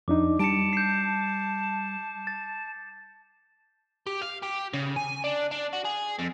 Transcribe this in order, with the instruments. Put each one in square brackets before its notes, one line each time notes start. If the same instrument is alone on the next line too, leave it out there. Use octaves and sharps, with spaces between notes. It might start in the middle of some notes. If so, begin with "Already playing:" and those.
[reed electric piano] F2 D4 D#4 [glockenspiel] D6
[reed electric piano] G3 [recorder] A5 [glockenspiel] C#7 D7
[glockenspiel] G6 C7
A6
[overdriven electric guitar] G4
F5
G4
C#3
G#5
D4
D4
F#4
G#4
F2